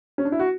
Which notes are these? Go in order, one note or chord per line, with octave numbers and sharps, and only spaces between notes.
C#4
D4
E4
F#4